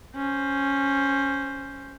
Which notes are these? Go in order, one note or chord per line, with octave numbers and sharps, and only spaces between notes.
C#4 C5